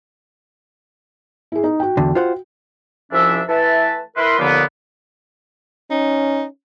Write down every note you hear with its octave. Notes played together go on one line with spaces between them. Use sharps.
E4 G#4
D#4
F#4 G5
E2 D3
F4 C5 F#5
C2 F2 F3 C#4 D4 E5
E3 A3 B4 E5 A5
E4 A#4 B4 C6
D#2 A#2 D3 F3 A#3 B3
C#4 D#4